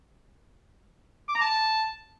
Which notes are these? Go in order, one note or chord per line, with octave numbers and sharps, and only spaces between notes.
D6
A#5
A5